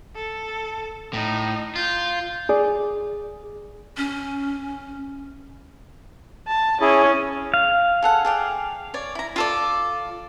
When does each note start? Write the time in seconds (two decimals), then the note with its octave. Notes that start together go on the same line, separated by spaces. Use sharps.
0.15 A4
1.13 A2 D#4
1.76 F4 G6
2.49 G#4 D5
3.97 C#4
6.48 A5
6.81 C#4 E4 G#4
7.54 F5
8.02 G#4 A4 F#5
8.25 G#4 D5 G5
8.94 C#5 D5
9.15 E4 A#5
9.36 F4 A4 D5